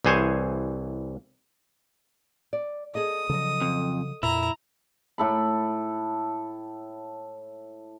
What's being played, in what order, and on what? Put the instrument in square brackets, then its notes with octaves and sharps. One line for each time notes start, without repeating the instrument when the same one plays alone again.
[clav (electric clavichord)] C2 E3 G#4 C5 C#5 G#5
[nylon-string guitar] D5
[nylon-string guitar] G#4 A4 D#5 [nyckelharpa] D#6
[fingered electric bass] C#3 F3 F#3 [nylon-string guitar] A4 D#5
[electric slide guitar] F2
[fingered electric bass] F2 A#2 [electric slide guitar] E4 [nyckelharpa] A#5
[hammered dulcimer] A2 A4 B5